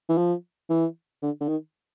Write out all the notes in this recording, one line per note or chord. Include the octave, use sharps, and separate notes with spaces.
E3
F3
E3
D3
D3
D#3